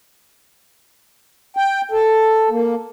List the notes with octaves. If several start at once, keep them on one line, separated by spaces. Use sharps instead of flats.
G5
A4
A#3